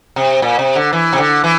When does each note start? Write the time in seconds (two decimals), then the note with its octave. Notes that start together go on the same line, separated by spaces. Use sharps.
0.16 C3
0.42 A#2
0.59 C3
0.75 D3
0.93 E3
1.13 C3
1.18 D3
1.44 E3